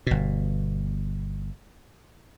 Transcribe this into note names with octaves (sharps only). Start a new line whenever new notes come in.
G1 B2